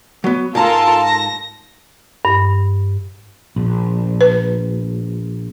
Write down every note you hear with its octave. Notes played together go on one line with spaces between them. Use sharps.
F#3 B3
G#2 F4 A4 A#4 A5 A#5
A#6
G2
A#1
B4